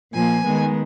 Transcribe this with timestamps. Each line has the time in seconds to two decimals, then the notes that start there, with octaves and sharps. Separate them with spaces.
0.13 A#2 F3 A#3 G#5
0.45 D#3 G#3 B3